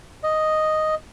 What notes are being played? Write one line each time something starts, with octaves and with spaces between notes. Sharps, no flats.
D#5